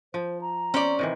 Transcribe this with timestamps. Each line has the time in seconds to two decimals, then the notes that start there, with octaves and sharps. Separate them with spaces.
0.14 F3 C5
0.41 A#5
0.74 C4 C#4 D5
0.99 C3 D#3 E3